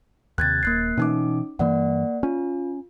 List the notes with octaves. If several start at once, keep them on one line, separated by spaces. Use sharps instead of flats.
D#2 C3 F#6 G#6 A6
D#1 A#3 F#6 C7
B2 E3 C#4 D#4 D6
G2 E3 A#3 D5 F#5
C#4 F4